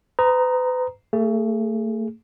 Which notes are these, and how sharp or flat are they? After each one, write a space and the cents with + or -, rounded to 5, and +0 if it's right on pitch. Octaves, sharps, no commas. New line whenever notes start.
B4 +40 A#5 +0 D#6 +0
A3 +35 G#4 +0